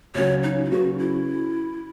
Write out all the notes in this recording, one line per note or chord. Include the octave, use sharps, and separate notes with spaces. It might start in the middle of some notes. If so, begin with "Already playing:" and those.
C#2 C#3 F#3 C#5
D#4
E4
C#3 F#3 C#4 F#4 G#4 B4
E4